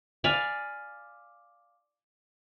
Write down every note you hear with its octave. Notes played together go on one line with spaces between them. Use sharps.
D5 F5 G#5 B5